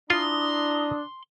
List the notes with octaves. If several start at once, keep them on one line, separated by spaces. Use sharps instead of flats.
D4 E4 F4 A#5 C6 D#6